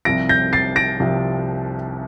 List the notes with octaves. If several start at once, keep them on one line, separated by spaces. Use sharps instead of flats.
C2 C3 F3 A#6 D7
G6 A#6
A6 C7
A#6 D7
C2 C3 F3